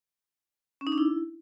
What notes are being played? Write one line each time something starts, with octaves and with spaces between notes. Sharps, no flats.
C#4
D#4
D4
E4